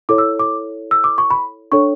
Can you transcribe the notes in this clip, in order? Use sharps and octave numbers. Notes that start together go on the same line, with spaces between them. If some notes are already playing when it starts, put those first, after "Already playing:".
E4 A4 C#5 D6
E6
D6
E6
D6
C#6
B5
D4 A4 C#5 C#6